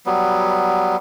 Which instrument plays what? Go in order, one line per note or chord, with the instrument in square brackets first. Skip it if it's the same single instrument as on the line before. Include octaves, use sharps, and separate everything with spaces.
[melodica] F#3 G3 B3